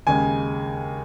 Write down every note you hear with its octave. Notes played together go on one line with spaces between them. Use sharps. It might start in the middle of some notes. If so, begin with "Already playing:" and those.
D#2 C#3 G#3 G#5